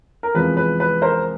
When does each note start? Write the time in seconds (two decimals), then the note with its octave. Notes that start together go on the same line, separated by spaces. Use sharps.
0.23 A#4
0.34 E2 C3 F3 G#3 B4
0.57 B4
0.80 B4
1.02 A#4 C5